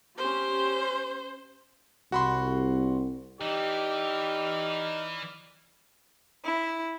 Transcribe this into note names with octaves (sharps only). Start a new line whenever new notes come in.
C#4 G4 C5
C2 F#4 B5 C6
E3 D#4 G4 D5 F6
E4